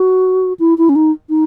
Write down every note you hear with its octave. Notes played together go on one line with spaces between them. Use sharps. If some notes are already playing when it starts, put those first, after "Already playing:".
Already playing: F#4
E4
E4
C#4
D#4
D#4